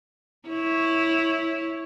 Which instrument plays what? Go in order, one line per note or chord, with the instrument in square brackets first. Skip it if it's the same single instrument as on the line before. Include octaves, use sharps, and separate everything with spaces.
[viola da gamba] E4 C#5